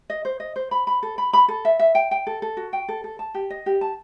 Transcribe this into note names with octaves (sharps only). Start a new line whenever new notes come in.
D#5
C5
D#5
C5
B5
B5
A4
B5
B5
A4
E5
E5
G5
G5
A4
A4
F#4
G5
A4
A4
A5
G4
D#5
G4
A5